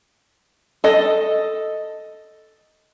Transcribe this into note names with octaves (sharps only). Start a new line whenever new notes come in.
A4 D#5